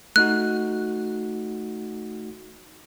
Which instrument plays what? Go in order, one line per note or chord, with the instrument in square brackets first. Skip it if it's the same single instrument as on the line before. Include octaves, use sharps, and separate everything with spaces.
[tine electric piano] A3 D#4 F#4 [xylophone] F#6